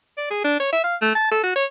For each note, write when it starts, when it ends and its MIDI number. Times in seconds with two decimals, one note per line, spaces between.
0.17 0.26 74
0.31 0.39 68
0.44 0.55 62
0.60 0.71 73
0.73 0.82 76
0.84 0.96 77
1.02 1.10 57
1.15 1.29 81
1.31 1.40 69
1.43 1.55 66
1.56 1.65 73